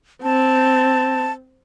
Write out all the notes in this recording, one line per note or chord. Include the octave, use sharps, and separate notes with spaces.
C4 A5